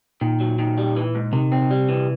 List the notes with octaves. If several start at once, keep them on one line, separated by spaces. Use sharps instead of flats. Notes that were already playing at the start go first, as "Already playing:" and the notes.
A#2 D#3
F#3
D#3
G3
E3
G#2
C3 D#3
C4
G3
E3